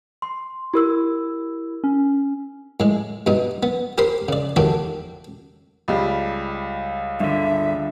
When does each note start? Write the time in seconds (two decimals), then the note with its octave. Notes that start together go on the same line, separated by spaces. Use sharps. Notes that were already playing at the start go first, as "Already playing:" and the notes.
0.22 C6
0.74 E4 G4 A#4 E6
1.84 C#4
2.80 A2 G#3
3.27 G2 B2 D#4
3.63 B3
3.98 G4 A#4 C5 B5 C6
4.28 C#3 D5
4.56 D#2 D#3 F#4 G4 A4 C#5
5.88 C#2 G3
7.20 G2 D3 E5